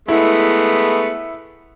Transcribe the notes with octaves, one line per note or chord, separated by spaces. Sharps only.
G#3 A3 B3 E4